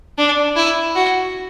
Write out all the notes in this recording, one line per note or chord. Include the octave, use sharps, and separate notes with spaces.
D4
E4
F#4